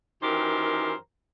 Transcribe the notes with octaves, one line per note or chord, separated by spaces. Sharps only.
F#2 D#3 E3 G4 A#4 C5